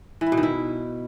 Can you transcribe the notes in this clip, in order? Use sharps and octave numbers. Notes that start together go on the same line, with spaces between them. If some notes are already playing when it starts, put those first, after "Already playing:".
E3
E4
B2
D#3
E4